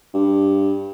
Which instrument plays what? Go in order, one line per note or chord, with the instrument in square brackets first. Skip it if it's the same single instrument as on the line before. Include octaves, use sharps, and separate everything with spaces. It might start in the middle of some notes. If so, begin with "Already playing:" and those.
[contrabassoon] G2